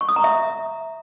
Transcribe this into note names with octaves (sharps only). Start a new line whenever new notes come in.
C#6
D#6
A#5
E5